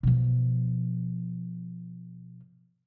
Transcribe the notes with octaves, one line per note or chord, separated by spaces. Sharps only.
B2 F3